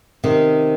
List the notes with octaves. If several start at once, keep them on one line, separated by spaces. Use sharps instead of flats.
C3 D#3